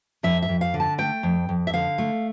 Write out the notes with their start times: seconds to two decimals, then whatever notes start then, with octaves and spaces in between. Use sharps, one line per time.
0.23 F2 E5
0.42 E5
0.49 F2
0.61 F5
0.74 D3
0.80 A5
0.98 A3 G5
1.23 F2
1.49 F2
1.67 E5
1.73 D3 F5
1.98 A3